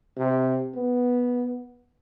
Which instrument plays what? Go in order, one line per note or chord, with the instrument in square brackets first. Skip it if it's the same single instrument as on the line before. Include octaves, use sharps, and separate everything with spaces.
[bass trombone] C3
B3